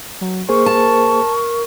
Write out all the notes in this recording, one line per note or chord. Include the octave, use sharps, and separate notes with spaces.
F#3
A#3 G#4 A#4 C5 C#6
A5